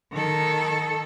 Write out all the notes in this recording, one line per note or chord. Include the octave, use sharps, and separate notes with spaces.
D#3 A4